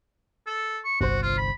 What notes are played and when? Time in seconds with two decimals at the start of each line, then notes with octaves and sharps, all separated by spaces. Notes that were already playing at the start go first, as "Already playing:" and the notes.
0.47 A4
0.85 C#6
1.01 G1 C2 F#4 C5
1.23 F4
1.38 B5